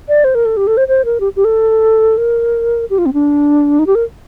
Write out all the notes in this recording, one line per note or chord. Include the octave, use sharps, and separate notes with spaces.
D5
C5
A#4
A4
G4
A4
C5
C5
A#4
G4
G4
A4
A#4
G4
F4
C4
D4
D#4
G4
A#4